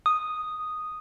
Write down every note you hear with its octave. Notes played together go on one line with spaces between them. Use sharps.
D#6